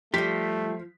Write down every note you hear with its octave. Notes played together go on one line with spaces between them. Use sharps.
F3 G3 A3 G4 B6